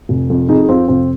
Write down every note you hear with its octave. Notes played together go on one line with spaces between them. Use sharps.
F1
F2
F2 D#4 G#4
G#4
F2 C4 F4
F1 C4 F4